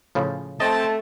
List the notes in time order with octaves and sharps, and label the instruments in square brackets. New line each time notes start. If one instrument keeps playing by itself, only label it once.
[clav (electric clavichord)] A2 C#3 F3
[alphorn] A3 [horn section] C4 A5 [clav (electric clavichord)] D#5